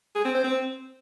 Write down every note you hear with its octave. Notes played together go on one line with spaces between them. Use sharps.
G#4
C4
C5
C4